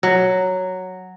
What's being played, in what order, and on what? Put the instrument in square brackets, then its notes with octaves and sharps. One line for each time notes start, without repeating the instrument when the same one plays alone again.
[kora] F#3